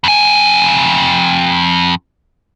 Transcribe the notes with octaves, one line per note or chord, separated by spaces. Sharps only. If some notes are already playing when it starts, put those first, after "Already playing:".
F2 G#5